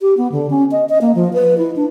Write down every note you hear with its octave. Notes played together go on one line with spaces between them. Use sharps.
G4
B3
D3
C#4
D#5
D#5
A#3
F3
B4
E4
D4